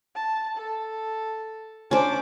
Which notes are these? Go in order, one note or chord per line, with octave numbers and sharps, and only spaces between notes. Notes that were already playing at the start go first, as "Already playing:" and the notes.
A5
A4
C#4 D4 C5 D6